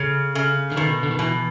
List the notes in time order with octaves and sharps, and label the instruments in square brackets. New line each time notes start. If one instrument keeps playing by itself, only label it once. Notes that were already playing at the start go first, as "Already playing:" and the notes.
Already playing: [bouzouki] C#3
C#3
[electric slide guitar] D3
[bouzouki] B2 [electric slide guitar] D#3
[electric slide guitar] D3
D#3
[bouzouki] B2 [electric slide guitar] E3